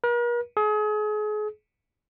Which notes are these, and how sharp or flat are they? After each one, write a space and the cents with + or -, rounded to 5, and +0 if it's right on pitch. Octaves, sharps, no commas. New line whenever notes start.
A#4 +45
G#4 +35